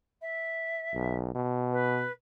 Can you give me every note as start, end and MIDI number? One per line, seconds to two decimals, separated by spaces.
0.21 1.16 76
0.95 1.34 35
1.35 2.05 47
1.72 2.11 71